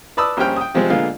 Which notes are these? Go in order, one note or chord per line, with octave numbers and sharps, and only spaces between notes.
B4 D5 A5 B5 D#6 E6
A#1 G3 C#4 C5 G5 F6
G5 D#6
C3 F3 G3 G#3 C4
A#2 D3 G#3 B3 F4 F5